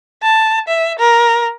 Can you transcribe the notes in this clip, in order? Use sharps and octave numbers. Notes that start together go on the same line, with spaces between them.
A5
E5
A#4